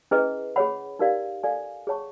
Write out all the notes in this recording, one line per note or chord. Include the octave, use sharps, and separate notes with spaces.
C#4 E4 G#4 B4 D#5
G#4 C#5 F#5 B5
D#4 G4 A#4 D5 F5
A4 D5 F5 G#5
G#4 C#5 F#5 A5 C#6